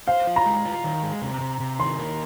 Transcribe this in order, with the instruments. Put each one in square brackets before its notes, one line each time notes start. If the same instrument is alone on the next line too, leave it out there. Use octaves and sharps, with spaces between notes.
[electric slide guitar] C5 [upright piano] F5
[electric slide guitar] F4
[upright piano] A#5
[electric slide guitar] G#3
F4
D#3
G#3
C3
C3
C3
[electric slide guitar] D#3 [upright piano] C6
[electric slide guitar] A#3